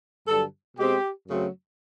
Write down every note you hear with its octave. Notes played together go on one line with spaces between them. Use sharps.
G2 D3 F#3 A4
B2 G#3 C4 G4
F#2 C#3 F#3 A3 C4